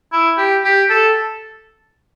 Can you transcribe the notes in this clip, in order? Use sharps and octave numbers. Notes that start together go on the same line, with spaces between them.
E4
G4
G4
A4